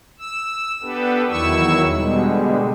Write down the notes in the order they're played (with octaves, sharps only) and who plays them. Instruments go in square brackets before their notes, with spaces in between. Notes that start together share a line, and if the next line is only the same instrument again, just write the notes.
[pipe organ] E6
B3 D4 G4 A4 B4
E2 D#3 F#3 E4 C#6 E6
B2 D3 G3 G#3